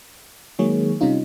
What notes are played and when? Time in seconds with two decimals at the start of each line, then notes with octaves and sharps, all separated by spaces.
0.59 D#3 F#3 G#3 A#3 G#4 C#5
1.01 C3 G3 C#4 D#4 F4